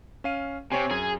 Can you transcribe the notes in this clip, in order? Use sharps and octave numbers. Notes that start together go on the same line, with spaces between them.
C#4 F5 D#7
C3 C4 C#5 G#5
F#2 G#4